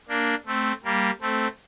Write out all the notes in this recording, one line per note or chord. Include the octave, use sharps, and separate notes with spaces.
A#3 D4
A3 C4
G3 A#3
A3 C4